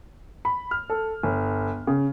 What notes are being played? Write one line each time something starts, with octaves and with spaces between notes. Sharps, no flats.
B5
F6
A4
G1
C#3